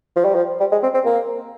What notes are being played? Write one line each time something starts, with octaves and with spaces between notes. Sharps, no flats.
F3
G3
F3
G3
G#3
C4
C4
A#3